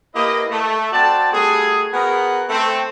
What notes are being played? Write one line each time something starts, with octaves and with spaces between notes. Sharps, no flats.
A#3 E4 G4 B4 D#5
A3
C4 F#4 D5 A5
G3 A3 F#4 G#4
B3 F#4 G#4 A#4
A3 C4